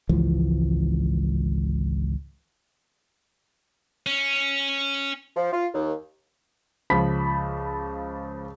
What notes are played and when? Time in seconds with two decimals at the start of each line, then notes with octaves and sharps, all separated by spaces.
0.09 G#1 C#2 E3 F3
4.06 C#4
5.36 F3
5.53 F4
5.74 D#2
6.90 C#2 F3 B5 B6